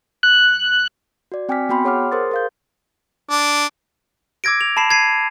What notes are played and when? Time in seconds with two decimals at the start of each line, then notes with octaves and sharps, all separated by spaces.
0.23 F#6
1.32 F#4 D5
1.49 C4 G5 G#5 D6 F6 B6
1.69 B3 F#4 G5 B5 C6
1.84 G#4 C#5 F#5 D6 F6
2.12 G#4 A#4 C5 C6 D#6 A6
2.31 A#4 F5 G6
3.30 D4
4.44 D6 E6 G#6 A#6 D7
4.61 F7
4.77 A5 B5 C7 E7
4.91 G#6 C7 D#7